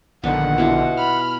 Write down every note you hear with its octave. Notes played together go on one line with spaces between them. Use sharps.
A#1 D3 D#3 B3 B4 F#5
B2 E4 F4
B5 F6